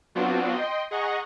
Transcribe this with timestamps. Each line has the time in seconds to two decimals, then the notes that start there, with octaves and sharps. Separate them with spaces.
0.15 F#3 B3 C4 D4 F4 F#4
0.54 D#5 G5 C6
0.91 G#4 D#5 F#5 A#5 C#6